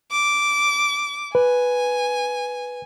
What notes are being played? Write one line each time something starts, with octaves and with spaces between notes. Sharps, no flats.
D6
B4 G#5